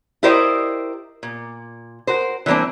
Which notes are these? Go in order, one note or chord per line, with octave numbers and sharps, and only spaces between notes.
E4 G4 A#4 C5 D5 D#5
A#2
F#4 A#4 C5
E3 G3 A#3 C4 D4